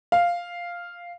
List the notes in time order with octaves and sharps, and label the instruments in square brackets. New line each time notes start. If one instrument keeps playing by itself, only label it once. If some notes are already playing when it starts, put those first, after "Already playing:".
[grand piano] F5